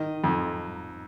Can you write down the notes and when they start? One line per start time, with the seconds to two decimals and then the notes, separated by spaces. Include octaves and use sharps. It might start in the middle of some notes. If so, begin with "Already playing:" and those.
Already playing: D#3 D#5
0.24 F2